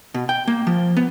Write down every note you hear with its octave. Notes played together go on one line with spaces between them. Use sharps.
B2
G5
A#3
F3
B3